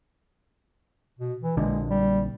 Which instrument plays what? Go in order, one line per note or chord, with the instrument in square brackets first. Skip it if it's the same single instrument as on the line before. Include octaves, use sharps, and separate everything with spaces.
[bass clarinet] B2
E3
[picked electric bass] A#1 D3 [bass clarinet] G#3
[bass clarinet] G3